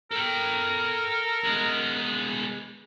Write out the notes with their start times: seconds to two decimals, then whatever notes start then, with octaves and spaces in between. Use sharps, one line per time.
0.11 A4 A#4 G5
1.44 G#3 B3